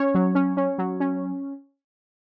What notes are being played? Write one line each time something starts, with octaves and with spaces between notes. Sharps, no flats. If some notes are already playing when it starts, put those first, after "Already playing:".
Already playing: C#4 C#5
F#3
C#4
C#4
F#3
C#4